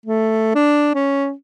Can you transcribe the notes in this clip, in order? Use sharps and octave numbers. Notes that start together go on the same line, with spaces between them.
A3
D4
C#4